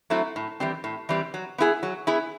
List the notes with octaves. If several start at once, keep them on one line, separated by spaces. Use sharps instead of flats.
F#3 A3 C4 E4
A2
E3 G3 C4
A2
E3 G3 C4
F#3
B3 E4 G#4
F#3
B3 E4 G#4